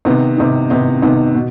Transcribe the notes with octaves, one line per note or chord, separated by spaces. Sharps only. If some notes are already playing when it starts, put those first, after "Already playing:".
C3 D#3 B3 D#4
C3 D#3 B3 D#4
C3 D#3 B3 D#4
C3 D#3 B3 D#4
B2